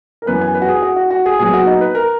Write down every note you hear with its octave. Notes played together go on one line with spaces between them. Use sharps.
A#4
F#2 E3 B3 B4
G#5
B4
F#4
G#4
F#4
F#4
F#4
G#4
A#2 F#3 B3 G#4
F#4
D#4
B4
A#4